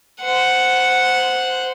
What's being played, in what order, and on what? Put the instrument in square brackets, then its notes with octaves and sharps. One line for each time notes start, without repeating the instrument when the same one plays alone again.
[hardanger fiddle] C5 F#5